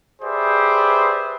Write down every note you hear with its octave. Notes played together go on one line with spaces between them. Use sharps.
G4 G#4 B4 C5 D5 E5